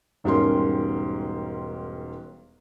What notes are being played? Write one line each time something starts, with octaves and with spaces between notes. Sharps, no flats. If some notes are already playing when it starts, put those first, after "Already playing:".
E1 G#2 G3 C#4 A#4 C6